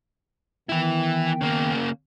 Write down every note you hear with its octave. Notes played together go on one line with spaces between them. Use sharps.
D#3 E3 B3 E4 G5
C#3 A#3